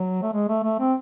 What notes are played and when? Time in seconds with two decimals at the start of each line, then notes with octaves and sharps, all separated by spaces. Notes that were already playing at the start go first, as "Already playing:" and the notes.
Already playing: F#3
0.22 A3
0.32 G#3
0.48 A3
0.63 A3
0.80 C4